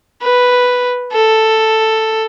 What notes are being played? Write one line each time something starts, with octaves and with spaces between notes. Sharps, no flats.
B4
A4